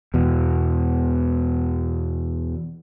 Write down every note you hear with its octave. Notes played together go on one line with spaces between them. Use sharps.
E2 B2